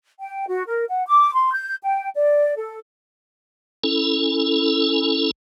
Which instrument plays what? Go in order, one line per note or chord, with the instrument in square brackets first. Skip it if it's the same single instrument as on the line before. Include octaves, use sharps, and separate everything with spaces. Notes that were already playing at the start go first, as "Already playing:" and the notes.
[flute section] G5
F#4
A#4
F#5
D6
C6
G6
G5
D5
A4
[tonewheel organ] C#4 E4 A4